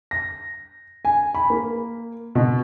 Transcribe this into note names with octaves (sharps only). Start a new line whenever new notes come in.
A#6
G#5
B5
A#3
B2